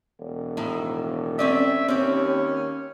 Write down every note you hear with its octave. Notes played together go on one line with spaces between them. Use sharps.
E1
A2 D#3
C4 C#4 D5 E5
D#2 C4 C#4 G4